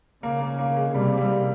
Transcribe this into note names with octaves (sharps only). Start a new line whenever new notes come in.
C#3 A#3
A#3
A#3
G#3
C3 G3
G3